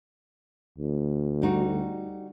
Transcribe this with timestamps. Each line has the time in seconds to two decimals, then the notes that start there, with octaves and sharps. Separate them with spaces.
0.78 D2
1.42 G3 D#4 F#4